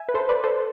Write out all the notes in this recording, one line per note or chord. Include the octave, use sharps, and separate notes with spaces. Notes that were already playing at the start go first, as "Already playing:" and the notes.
Already playing: E5 G#5
B4
A4 C5
B4 D5
A4 C5